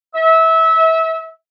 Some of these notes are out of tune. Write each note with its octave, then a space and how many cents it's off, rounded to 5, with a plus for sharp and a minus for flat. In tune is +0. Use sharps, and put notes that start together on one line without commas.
E5 -25